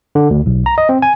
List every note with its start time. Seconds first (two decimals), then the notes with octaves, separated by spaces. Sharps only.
0.15 D3
0.31 D2
0.46 B1
0.66 A#5
0.78 D#5
0.89 C4
1.02 G#5